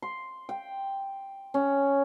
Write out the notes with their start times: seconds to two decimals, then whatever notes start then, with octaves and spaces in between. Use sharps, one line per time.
0.02 C6
0.49 G5
1.54 C#4